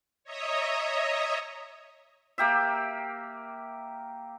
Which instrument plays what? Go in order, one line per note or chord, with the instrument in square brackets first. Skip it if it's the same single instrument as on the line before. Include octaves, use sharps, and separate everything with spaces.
[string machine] C#5 D#5 E5 A#5 D#6
[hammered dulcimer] A#3 G4 E5